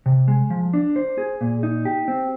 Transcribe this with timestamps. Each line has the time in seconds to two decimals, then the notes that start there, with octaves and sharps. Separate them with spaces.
0.06 C3
0.28 G#3
0.50 F3
0.73 D4
0.96 C5
1.18 G#4
1.41 A#2
1.63 D#4
1.85 G4
2.08 C4